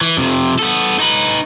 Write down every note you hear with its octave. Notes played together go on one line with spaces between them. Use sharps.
E3
F2 C3
B3 A4
D#4 B4